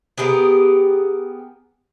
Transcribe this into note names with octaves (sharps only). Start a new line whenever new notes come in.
B3 G4 G#4 A#4